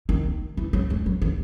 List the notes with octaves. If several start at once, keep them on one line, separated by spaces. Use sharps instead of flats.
D#3
E3
F#3
G#3
F#3
D#3